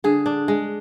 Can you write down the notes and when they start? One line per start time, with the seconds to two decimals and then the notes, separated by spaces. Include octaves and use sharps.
0.04 D3 G#4
0.26 D4
0.48 G#3